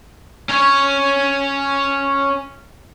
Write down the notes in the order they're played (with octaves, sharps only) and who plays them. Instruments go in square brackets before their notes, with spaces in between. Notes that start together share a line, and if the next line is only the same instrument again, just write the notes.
[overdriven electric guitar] C#4 C#5